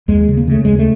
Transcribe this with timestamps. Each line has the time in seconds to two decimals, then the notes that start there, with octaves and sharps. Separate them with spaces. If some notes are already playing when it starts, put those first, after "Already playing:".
0.08 D#2 G#3
0.28 C#3
0.37 A#3
0.47 C#3 A3
0.65 D#2 G#3
0.79 A3